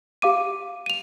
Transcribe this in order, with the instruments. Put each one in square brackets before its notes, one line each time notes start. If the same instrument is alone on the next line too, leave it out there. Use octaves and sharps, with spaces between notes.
[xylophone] G4 F5 D6 D#7
D#7 F7